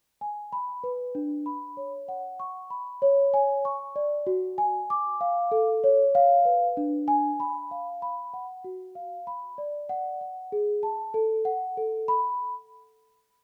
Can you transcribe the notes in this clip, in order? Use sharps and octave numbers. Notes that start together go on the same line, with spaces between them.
G#5
B5
B4
D4
B5
C#5
F#5
C#6
B5
C#5
G#5
C#6
D5
F#4
G#5
D6
F5
A4
C#5
F5
B4
D4
G#5
B5
F5
B5
F#5
F#4
F5
B5
D5
F#5
F#5
G#4
A5
A4
F#5
A4
B5